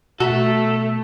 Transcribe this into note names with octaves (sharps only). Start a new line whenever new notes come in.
B2 A3 F#4 A4 A#5 B6